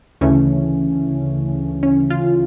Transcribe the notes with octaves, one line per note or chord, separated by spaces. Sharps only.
D2 C#3 E3 A3 C#4
C#4
F4